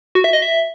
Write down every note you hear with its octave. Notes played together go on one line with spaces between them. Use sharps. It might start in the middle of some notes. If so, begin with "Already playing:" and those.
F#4
E5
D#5
E5